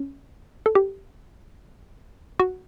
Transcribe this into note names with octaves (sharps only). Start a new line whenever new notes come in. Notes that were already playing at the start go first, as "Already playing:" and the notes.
Already playing: C#4
A4
G4
F#4